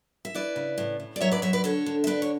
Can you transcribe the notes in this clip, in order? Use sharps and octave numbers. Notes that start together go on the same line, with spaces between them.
E5
E4 B4 D5
C#3
A2
A2
D5
F#3 C#5 E5
B4 D5
F#3 C#5 E5
B4 D5
D3 A4 C#5
D3
E5
D4 B4 D5
C#5